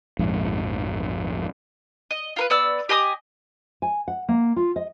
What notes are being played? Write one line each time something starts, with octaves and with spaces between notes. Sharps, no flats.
A#1 F2 G#2
D#5
F4 A#4 B4
B3 D5 E6
G4 D#5 G#5 D#6
G#5
F#5
A#3
F4
D#5